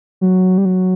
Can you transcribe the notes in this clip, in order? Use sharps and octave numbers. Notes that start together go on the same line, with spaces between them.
F#3
G3
F#3